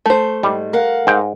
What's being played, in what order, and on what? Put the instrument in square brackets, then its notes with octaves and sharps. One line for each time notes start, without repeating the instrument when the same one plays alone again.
[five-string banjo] A3 C5
[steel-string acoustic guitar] G#2 [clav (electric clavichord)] G3
[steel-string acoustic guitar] A#4 F5 F#5
[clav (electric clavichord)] G#2 G5